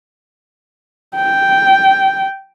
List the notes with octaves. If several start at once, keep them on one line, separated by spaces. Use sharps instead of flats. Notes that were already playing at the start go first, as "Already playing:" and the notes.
G5